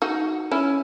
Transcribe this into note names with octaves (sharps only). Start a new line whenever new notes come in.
D#4 F#4
C#4 E4